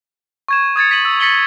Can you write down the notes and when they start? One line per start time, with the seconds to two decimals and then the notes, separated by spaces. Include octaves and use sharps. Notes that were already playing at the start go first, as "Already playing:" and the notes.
0.48 C#6 G#6 E7
0.76 D#6 G#6 A6 C#7
0.91 B6 D#7 F#7
1.05 E6
1.20 A6 B6 C#7 F#7 G7